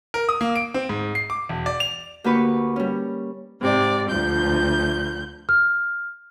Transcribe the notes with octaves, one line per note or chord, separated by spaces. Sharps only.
A#4
D#6
A#3
D7
C4
G#2
C7
D6
E1
D5
F7
D2 A#3 G4 B4 C#6
G3 C#4
G#2 C3 D5
D2 F3 G6
F6